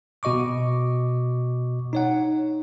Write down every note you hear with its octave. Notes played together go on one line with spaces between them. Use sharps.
B2 F#4 D#5 C#6 D6
D#4 C#5 F#5